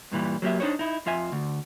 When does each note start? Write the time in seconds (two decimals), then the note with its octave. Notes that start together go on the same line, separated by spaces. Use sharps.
0.12 G2 A#2 E3 G3
0.42 F#3 A#3 G4 E5
0.60 D4 D#4 G#4 C5 C#5
0.79 D#4 E4
1.06 F2 F4 E5 G#5
1.32 D2